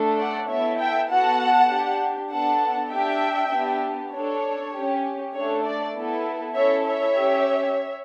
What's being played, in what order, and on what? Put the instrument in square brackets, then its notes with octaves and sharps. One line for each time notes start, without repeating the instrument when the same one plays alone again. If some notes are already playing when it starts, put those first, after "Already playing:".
Already playing: [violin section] A3 D4 A4
D5 F#5
B3 E4 A4 C#5 E5
E5 G5
B3 F#4 A4 F#5 A5
D4 G4
B3 D4 A4 F#5 A5
D4 G4 E5 G5
B3 D4 G4
D4 A4 C#5
C#4 G4
A3 D4 A4 C#5
D5
B3 E4 A4
C#4 E4 A4 C#5 E5
C#5 E5
C#4 G4